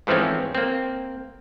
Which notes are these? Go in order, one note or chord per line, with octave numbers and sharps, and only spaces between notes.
G#2 E3 F3 A3 C4 C#4
A#3 C4